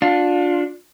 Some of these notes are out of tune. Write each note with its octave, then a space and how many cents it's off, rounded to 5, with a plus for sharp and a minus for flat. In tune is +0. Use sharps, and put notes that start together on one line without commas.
D4 +0 F4 +30